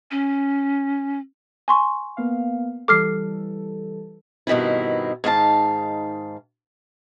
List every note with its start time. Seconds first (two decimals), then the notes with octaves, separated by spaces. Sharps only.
0.11 C#4
1.68 G#5 C6 C#6
2.17 A#3 B3 F5
2.88 E3 G3 A4 D6 F6 C7
4.47 G2 B2 D#3 C4 E4
5.24 G#2 D#3 F5 A5